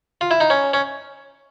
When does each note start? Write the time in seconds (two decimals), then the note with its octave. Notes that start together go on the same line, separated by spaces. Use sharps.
0.21 F4
0.31 E4
0.40 D#4
0.50 C#4
0.74 C#4